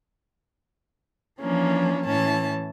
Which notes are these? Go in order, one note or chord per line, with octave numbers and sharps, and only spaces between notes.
E3 F3 A#3 C#4 D4
A2 E3 C#4 A5